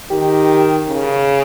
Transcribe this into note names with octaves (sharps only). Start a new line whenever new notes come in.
D#3 G4
C#3